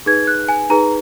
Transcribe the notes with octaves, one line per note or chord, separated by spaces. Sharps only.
D#4 G#4 B4 G#6
F#6
G#5
D#4 G#4 B4 A#5